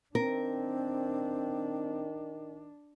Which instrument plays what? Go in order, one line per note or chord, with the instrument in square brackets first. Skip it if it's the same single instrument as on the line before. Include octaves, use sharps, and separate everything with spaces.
[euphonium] D#3 [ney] C4 [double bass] D4 [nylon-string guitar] A#4